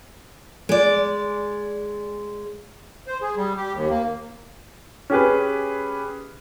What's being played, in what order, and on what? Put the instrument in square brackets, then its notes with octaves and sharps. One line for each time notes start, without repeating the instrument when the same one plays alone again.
[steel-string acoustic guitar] G#3 D5
[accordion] C5
G#4
G3
G4
D#2
A#3
[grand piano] C#4 G4 G#4 B4